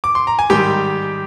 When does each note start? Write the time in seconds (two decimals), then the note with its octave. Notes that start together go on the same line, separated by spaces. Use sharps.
0.04 D6
0.15 C6
0.27 A#5
0.39 G#5
0.50 G#2 D#3 G3 G4 G5